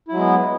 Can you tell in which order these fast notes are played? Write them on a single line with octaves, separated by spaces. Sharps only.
E4 F#3 G#3 B3